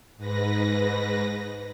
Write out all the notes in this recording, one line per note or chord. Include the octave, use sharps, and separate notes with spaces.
G#2 B4 A#6